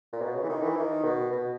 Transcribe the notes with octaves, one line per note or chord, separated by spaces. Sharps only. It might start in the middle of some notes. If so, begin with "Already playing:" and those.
A#2
B2
C#3
E3
D#3
E3
D#3
B2
B2